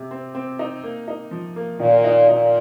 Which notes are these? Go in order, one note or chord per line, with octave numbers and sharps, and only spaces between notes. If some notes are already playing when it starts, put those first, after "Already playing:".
Already playing: C3
C4
C4
D#4
A#3
D#4
F3
A#3
A#2 D#3
D#4
A#2 D#4